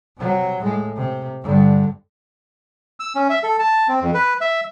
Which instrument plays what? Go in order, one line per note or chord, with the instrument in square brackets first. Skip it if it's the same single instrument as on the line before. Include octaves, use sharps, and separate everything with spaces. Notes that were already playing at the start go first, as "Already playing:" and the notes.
[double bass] C3 F#3
A2 G#3
C3
G2 D3
[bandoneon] E6
C#4
E5
A4
A5
C4
F2
B4
E5